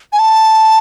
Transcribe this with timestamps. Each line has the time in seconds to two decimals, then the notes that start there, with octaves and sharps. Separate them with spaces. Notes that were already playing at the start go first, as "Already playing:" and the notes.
0.13 G#5
0.19 A5